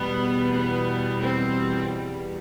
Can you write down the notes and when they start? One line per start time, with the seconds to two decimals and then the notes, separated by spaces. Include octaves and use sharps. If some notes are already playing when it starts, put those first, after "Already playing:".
Already playing: E2 B2 G3 B3
0.52 B3
1.20 C4